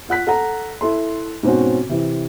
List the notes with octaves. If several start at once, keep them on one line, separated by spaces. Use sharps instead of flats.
F4 F#5 F#6 B6
A4 F#5 A#5
E4 A4 C6
G#2 B2 C4 C#4 F#4
C3 E3